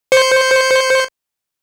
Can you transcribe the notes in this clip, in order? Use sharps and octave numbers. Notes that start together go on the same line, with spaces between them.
C5 G6 C#7